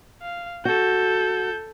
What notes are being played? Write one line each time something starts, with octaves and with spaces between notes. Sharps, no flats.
F5
F#4 A4 G6